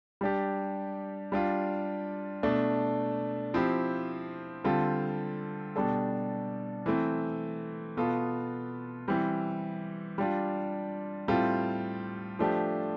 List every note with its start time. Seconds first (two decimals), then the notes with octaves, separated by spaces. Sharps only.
0.21 G3 D4 G4
1.32 G3 D4 F4
2.43 B2 A3 D4
3.54 F3 C4 E4 G4
4.64 D3 G3 C4 F4 A4
5.76 B2 G3 D4 A4
6.86 E3 A3 C4
7.97 B2 B3 F4 A4
9.08 E3 G3 C4
10.18 G3 D4 F4
11.28 A2 G3 C4 F4 A4
12.39 F3 A3 D4 G4